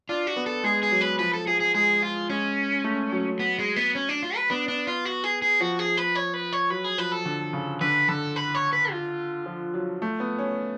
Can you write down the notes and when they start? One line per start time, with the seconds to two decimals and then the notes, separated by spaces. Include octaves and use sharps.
0.09 D4 F4
0.27 F#4
0.36 B3
0.46 A4
0.64 G#3 G#4
0.83 G#4
0.91 F#3
1.01 B4
1.19 F3 B4
1.33 A4
1.47 F3 G#4
1.60 G#4
1.75 G#3 G#4
2.02 F4
2.29 G#3 C#4
2.84 A3
3.12 F#3
3.40 B3
3.59 G#3
3.76 B3
3.95 C#4
4.09 D4
4.23 F4
4.36 B4
4.50 B3 D4
4.68 D4
4.87 F4
5.05 F#4
5.24 G#4
5.42 G#4
5.60 F3 F#4
5.79 G#4
5.97 B4
6.16 C#5
6.34 B4
6.53 C#5
6.70 F#3 B4
6.84 G#4
6.98 F3 B4
7.12 A4
7.26 D3
7.53 C#3
7.81 D3 B4
8.08 D3 A4
8.36 B4
8.55 C#5
8.73 B4
8.91 F4
9.46 F3
9.74 F#3
10.02 A3
10.20 B3
10.38 C#4